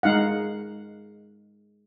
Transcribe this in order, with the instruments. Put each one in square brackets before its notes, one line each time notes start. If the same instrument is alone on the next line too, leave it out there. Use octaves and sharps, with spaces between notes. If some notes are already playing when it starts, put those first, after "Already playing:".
[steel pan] G#3 D#4 F5 F#5